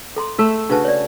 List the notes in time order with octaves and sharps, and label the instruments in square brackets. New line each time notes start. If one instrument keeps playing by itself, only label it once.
[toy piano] A4 A#5 C6
[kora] A3 E5
[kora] C#3 F#4 [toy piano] D4 B4 A5
[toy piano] C#5 D5